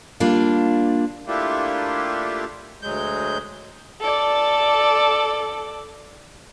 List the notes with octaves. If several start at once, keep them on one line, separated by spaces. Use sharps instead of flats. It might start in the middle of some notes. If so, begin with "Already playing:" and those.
G3 A#3 D4 F4
A3 A#3 D4 E4 F4 G4
D2 F#3 G#3 G6
A4 D5